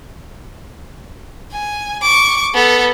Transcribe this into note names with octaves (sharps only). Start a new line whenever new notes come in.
G#5
C#6 D6
B3 A4